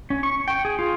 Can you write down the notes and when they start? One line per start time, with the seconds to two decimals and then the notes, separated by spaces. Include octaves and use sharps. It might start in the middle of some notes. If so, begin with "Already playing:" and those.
0.10 C#4
0.23 C#6
0.48 G5
0.65 G#4
0.79 F4